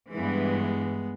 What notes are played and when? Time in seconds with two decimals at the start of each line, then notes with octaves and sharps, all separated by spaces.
0.12 G2 E3 G#3 B3